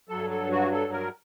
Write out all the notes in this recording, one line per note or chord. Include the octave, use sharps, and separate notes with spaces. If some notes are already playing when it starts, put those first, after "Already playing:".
G2 F#3 A4
A4
F#4
A4
A#4